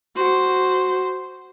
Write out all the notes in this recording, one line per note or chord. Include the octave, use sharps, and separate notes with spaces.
F#4 C5